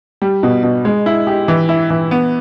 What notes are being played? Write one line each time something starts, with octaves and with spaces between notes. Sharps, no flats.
G3
B2
B2
G#3
E4
G4
E3
E4
E3
B3